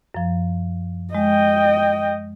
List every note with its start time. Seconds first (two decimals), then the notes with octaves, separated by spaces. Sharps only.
0.15 F#2 F3
1.15 G#3 D#5 G5